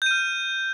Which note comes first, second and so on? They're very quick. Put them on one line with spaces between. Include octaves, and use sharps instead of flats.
G6 D#7 F6